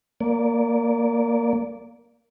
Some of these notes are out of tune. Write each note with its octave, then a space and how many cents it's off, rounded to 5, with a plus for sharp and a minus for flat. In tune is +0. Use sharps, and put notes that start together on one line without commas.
A#3 +0 D5 -20